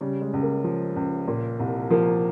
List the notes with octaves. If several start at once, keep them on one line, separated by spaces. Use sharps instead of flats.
C#3 G3
G#3
C#2
A#3
F3
C#2
A#2
C2
F3 A#3